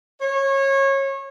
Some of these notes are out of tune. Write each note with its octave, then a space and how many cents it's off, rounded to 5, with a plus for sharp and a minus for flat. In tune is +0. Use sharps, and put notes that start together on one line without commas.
C#5 -25